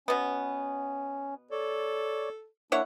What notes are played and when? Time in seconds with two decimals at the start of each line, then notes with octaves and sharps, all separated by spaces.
0.08 B2 B3 C#4
1.51 A4 C#5 D5
2.72 A#3 D4 E4 C#5 F#5